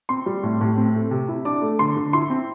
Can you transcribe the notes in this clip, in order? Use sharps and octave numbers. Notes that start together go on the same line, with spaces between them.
C4 C6
G3
A2
A2
C4
A3
C3
E4
D4 D6
A3
D3 C6
D3
E4 C6
C4